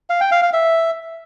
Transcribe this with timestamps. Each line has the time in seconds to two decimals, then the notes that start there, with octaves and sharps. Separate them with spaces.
0.10 F5
0.21 G5
0.31 F5
0.42 F5
0.53 E5